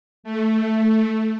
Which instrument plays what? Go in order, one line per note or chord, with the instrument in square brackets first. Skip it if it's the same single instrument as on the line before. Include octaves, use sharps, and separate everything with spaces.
[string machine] A3